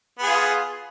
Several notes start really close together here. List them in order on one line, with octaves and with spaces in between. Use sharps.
B3 G#4 F4